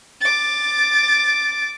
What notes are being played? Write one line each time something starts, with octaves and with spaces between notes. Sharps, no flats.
D6 A6